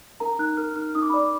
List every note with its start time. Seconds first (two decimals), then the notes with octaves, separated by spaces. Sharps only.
0.20 A#4 A#5
0.39 D#4 F#6
0.57 A#4 F6
0.76 D#4 F6
0.95 D#4 D#6
1.02 D6
1.10 B5
1.14 D5 D6